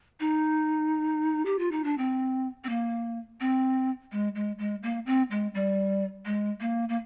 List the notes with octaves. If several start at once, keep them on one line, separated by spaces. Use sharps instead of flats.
D#4
G4
F4
D#4
D4
C4
C4
A#3
C4
G#3
G#3
G#3
A#3
C4
G#3
G3
G#3
A#3
A#3